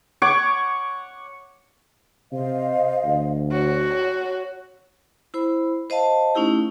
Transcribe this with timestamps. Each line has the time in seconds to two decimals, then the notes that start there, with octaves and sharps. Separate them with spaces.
0.22 C#5 F#5 C#6 D6
2.32 C3 C5 D#5 F5
3.05 D2
3.52 F#4 C#5
5.34 E4 C5 B5
5.90 C5 D#5 F5 A5
6.35 A3 C#4 D#4 E4 G4